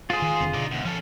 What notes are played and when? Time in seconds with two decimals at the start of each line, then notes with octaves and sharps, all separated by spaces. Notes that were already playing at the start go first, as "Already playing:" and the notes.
0.10 G#3 F4 G#4 C5
0.22 D#3
0.40 F1 D3 C4
0.54 B2 D3 D#4 D5
0.71 E2 G#2
0.85 F3 C#4 A4